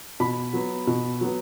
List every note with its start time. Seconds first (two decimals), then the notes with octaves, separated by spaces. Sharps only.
0.20 B2 B5
0.53 F#3 B3
0.87 B2
1.21 F#3 B3